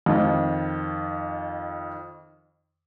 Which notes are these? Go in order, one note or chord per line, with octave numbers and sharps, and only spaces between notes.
F2 D#3